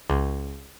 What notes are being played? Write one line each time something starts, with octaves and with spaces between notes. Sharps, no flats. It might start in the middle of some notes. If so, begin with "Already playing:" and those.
C#2